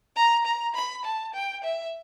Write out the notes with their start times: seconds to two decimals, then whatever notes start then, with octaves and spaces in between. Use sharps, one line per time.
0.16 A#5
0.45 A#5
0.74 B5
1.05 A5
1.34 G5
1.64 E5